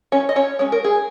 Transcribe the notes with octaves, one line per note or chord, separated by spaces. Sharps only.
C#4 C#5
D#5
C#4 C#5
G#3 C#4 C#5
A#4
G#4